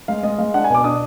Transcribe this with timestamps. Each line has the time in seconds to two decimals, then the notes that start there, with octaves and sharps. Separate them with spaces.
0.08 G#3 F5
0.23 G#3 D#5
0.38 G#3 F5
0.54 D4 F#5
0.64 G#5
0.70 B2 D6
0.84 D4 D#6